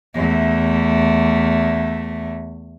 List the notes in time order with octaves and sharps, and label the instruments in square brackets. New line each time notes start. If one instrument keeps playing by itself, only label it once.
[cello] E2 A3